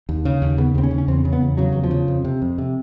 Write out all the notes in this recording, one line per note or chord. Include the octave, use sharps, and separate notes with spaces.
D#2
C#3
D#2
C#3 B3
D#2 C4
C#4
C#3
C#4
E2 C4
C#3
B3
E2
C#3 F#3
E2 F#3
F3
C#3
F2
C3
F2
C3